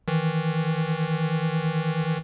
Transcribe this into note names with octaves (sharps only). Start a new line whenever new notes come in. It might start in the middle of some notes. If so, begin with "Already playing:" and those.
D#3 E3